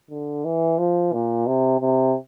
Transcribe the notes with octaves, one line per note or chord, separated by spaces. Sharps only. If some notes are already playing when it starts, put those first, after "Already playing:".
D3
E3
F3
A#2
C3
C3